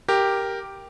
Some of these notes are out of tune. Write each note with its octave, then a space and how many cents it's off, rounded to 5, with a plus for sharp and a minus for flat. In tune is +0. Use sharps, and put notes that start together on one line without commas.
G4 +0 A#4 +0 G5 +0